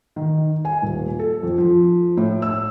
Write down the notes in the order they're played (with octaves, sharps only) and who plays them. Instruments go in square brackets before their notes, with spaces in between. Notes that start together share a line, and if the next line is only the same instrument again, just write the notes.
[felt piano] D#3
G#5
D#1
A4
F2
F3
A2
E6